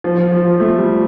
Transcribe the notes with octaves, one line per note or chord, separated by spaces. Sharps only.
F3
F3
F3
F3
A3
G3